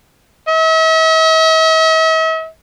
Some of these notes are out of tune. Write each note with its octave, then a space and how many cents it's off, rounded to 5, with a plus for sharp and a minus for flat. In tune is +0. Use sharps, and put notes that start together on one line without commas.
E5 -45